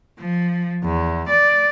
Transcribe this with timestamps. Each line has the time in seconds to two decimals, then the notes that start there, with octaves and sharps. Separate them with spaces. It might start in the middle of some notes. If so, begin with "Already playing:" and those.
0.18 F3
0.84 E2
1.29 D5